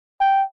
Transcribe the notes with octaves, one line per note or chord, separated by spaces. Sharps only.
G5